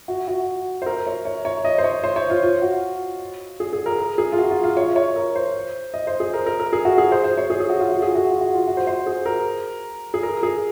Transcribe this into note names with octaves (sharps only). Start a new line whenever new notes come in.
F#4
F#4
C5
A#4
C#5
C#5
C#5
D#5
C5
C#5
C5
C#5
F4
F4
F#4
G#4
G#4
A#4
A#4
G#4
F4
F#4
F4
F4
C#5
C#5
A#4
C5
D#5
C5
G#4
A#4
A#4
A#4
G#4
F#4
G#4
C5
C5
C#5
G#4
G#4
F#4
F4
F#4
G#4
F#4
F4
F#4
F4
F#4
C5
C5
G#4
A#4
G#4
A#4
G#4